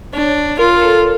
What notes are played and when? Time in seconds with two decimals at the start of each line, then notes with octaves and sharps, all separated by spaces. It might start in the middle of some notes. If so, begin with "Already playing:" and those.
0.13 D4 C#5
0.59 F4 A#4
0.81 A4